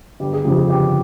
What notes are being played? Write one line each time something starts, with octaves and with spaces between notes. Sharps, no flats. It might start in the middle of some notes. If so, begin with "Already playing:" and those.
G1 G4
G#4
F2 C#3 F3 G4
G#4
G1 G4